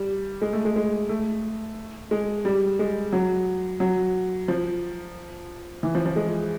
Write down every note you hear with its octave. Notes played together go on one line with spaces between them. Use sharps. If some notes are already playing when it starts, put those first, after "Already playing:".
Already playing: G3
G#3
A3
G#3
G#3
A3
G#3
G3
G#3
F#3
F#3
F3
E3
F3
F3
G#3